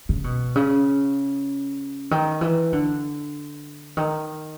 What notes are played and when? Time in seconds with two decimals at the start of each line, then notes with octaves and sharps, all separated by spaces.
0.09 C#3
0.24 B2
0.56 C#3
2.11 D#3
2.41 E3
2.73 D3
3.97 D#3